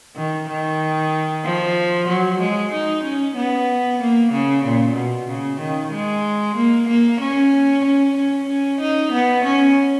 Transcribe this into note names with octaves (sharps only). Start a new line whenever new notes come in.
D#3
D#3
F3
F#3
G#3
D#4
C#4
B3
A#3
C#3
A#2
B2
C#3
D#3
G#3
A#3
A#3
C#4
C#4
C#4
C#4
D#4
B3
C#4